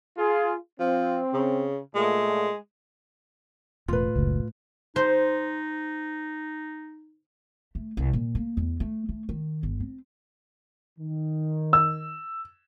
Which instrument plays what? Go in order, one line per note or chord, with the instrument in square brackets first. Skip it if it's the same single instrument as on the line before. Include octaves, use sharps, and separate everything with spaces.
[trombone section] F4 G#4
[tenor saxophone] F3 [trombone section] C4
[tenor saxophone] C#3
[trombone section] A#2 A3 [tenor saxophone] G#3
[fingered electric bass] E1 [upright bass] A2 [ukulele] F4 B4
[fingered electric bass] F#1 C#2
[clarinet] D#4 [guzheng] C5
[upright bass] A3
C2
A#2
A#3
E2
A3
A3
D#3
G1
C4
[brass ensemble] D#3
[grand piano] E6